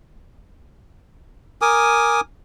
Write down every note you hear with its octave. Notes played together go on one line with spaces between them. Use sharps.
A#4 G#5 D6 D#6